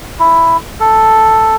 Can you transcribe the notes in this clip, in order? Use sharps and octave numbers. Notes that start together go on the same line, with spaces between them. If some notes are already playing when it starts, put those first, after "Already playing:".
E4
A4